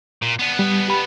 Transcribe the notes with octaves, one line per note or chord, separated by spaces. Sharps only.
A#2
B3 D4
G3
G4 B5